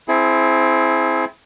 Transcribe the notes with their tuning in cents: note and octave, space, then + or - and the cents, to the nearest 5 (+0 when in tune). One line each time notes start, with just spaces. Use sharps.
C4 +0 E4 +0 G#4 +35